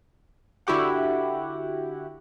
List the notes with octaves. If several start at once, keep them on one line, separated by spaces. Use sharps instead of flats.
D3 E4 F#4 G4 F#5